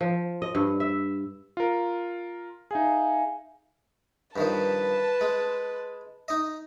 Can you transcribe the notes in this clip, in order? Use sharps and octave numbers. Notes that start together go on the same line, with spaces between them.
F3
D#5
G2
E5
F4 A#4
D#4 G#4 E5 F5 G#5
G2 D#3 F3 B4 A5
G#3
D#4 D#5